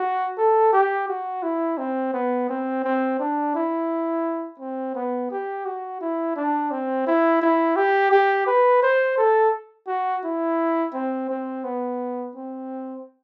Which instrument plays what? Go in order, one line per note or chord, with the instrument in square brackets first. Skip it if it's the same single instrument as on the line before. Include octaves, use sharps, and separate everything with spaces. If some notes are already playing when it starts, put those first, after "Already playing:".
Already playing: [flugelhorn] F#4
A4
G4
F#4
E4
C4
B3
C4
C4
D4
E4
C4
B3
G4
F#4
E4
D4
C4
E4
E4
G4
G4
B4
C5
A4
F#4
E4
C4
C4
B3
C4